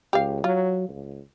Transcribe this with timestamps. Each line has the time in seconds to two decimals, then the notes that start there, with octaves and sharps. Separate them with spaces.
0.13 C#2 G4 F5
0.44 F#3 F4
0.89 C#2